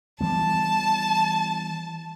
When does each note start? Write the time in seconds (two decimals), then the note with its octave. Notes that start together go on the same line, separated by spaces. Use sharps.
0.21 E3 G3 B3 A5